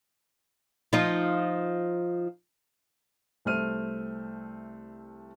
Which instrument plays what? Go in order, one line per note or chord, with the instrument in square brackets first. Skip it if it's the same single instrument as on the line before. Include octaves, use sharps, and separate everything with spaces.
[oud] F3 D#4 F4
[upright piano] C2 A3 C5 F6 D#7